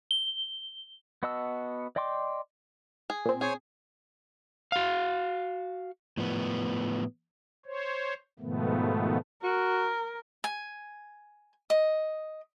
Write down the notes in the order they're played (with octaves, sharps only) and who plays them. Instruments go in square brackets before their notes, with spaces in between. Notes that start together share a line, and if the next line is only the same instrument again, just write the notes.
[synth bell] G7
[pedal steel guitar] B3 F#4 D#5 A5 E6
D5 D#5 G5 C6 D6
[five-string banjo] G#4
[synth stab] A#2 C4
[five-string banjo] G#4 [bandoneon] C5 C#5 G#5
[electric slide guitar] F#4 F5
A2 F3 B3
[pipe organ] C5 C#5
G#2 B2 D#3 F3 A3 B3
[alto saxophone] F#4 [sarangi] A#4
[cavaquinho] G#5
D#5